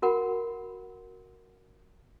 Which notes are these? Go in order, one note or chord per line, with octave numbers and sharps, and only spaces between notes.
F#4 A#4 F#5 B5